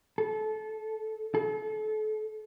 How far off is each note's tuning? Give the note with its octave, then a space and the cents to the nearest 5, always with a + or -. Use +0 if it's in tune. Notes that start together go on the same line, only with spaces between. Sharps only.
A4 -25
A4 -35